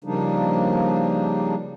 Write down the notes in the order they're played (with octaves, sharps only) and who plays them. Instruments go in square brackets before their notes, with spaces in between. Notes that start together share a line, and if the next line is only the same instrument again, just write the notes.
[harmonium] C#3 F3 G3 A#3 D4 D#4